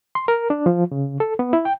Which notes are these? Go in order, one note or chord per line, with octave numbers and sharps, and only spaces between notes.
C6
A#4
D4
F3
C#3
A4
B3
E4
G5